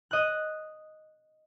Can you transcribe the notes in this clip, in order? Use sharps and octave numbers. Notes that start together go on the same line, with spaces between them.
D#5 F#6